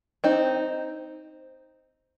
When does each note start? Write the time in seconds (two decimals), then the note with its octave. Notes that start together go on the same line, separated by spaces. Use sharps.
0.24 C4 D#4